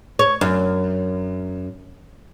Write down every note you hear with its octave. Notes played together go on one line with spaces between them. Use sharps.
C#5
F#2